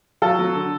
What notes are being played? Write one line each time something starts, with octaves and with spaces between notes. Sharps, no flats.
F#3 A4
F#3
D3